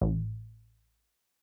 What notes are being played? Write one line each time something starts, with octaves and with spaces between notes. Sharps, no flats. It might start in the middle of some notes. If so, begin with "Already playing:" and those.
A1